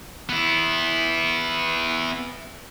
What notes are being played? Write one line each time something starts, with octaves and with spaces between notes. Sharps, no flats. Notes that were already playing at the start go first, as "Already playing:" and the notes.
B3 E4